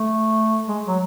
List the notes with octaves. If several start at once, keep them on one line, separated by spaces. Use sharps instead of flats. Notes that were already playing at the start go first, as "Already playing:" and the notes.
Already playing: A3
G#3
F#3